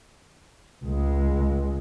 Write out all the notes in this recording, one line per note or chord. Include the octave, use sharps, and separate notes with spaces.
C#2 G#3